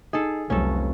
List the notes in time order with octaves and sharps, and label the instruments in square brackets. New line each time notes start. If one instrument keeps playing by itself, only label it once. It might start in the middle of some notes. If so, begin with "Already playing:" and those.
[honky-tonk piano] D#4 [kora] G#4 A4
[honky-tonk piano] F1 [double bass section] C2 F#3 [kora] C#4 A4